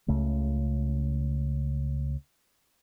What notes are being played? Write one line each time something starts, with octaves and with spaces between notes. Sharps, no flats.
C#2 C#3 A3